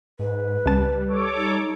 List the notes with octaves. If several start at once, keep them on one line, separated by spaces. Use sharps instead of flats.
G#2 B4
C#2 G3 A5
A4 C#5 D6
D#4